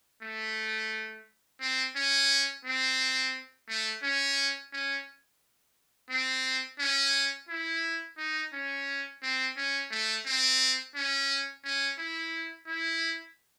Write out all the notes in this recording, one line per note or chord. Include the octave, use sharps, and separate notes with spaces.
A3
C4
C#4
C4
A3
C#4
C#4
C4
C#4
E4
D#4
C#4
C4
C#4
A3
C4
C#4
C#4
E4
E4